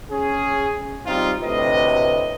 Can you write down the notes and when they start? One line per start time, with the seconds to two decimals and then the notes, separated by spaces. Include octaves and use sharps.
0.10 C#4 G#4
1.06 G3 C4 D#4 F4
1.43 D2 A2 C3 B4 D#5